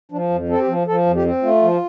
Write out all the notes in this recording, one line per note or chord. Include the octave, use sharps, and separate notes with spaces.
F3 D4
F2
C4 A4
G4
F3
F3 A4
F2
G4
C4
A3 F4
F3